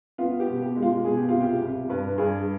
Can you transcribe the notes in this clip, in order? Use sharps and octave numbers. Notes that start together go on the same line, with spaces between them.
B3 F4
G4
B2
G4
G#3
F4
B2 G#4
G4
C2 F4
G4
C2
G2 B4
G2 G#4